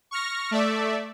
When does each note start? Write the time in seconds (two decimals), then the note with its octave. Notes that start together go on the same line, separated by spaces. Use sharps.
0.11 C#6 F6 A#6
0.51 A3 D5 E5